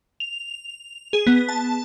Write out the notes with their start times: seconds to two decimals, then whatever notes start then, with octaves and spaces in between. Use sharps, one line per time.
0.20 F7
1.13 G#4
1.27 B3
1.49 A5